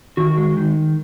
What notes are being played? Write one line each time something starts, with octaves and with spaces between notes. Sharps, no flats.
D#3 F#4
G#3
D#3